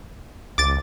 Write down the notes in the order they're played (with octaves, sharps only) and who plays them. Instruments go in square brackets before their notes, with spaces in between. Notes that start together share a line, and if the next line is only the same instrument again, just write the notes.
[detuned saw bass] C#2 [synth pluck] D6 A6